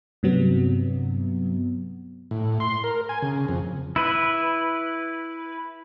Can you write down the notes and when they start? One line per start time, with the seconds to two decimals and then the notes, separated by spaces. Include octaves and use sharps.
0.23 G2 C3 F#3 B3
2.31 A2
2.60 C6
2.84 A#4
3.09 G#5
3.22 C#3
3.49 F2
3.96 E4 B4